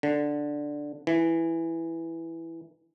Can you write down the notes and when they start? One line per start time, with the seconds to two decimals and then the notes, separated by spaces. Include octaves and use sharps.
0.03 D3
1.07 E3